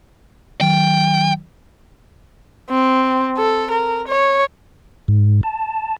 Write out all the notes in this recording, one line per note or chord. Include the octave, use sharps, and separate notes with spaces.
D#3 F#3 G5
C4
A4
A#4
C#5
G#2
A5